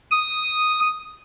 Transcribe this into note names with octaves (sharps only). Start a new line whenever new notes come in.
D#6